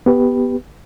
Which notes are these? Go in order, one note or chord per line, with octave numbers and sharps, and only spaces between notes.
B3 G4 B4